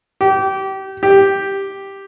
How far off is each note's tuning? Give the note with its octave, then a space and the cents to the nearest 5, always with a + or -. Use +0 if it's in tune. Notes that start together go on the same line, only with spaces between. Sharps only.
G4 -25
G4 +0